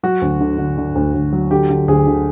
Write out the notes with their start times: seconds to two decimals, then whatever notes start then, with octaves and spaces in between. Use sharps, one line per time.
0.03 F#3 F#4
0.21 D2
0.41 D3
0.58 D3
0.78 D3
0.95 D2
1.14 D2
1.32 F#3
1.51 D3 G4
1.70 D3
1.88 D2 G#4
2.07 D3